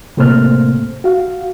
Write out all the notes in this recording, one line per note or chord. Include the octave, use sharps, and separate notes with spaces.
A2 C3 A3 A#3 C5 F6
F#4 F5